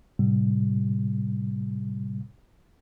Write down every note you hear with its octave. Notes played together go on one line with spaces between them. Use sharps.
A2 C3 G3